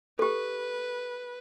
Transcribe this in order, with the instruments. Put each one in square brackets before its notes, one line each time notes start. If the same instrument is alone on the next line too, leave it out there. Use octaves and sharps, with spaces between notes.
[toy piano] G4 A4 [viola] B4